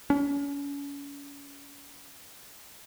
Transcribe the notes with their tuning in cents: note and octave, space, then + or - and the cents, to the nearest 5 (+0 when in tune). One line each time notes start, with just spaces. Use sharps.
C#4 +35